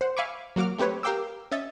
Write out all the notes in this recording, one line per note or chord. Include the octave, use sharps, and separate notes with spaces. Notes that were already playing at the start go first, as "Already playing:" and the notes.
C5 F#5
E5 F5 G#5 B5 C#6 D6
F#3 A#3 F#4 D6 F6
A3 C4 G4 B4 C#5
G4 A#4 F5 G5 D6 E6
C#4 D#5 E5 A6